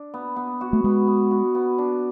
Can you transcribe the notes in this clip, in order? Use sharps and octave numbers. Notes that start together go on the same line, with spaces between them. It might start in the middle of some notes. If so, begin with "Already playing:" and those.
Already playing: D4
B3
B3
F#4
A3
G#3 B3
B3
F#4
B3
D4